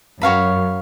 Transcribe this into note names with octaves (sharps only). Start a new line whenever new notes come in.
F#2 F#4 C#5 F5 B5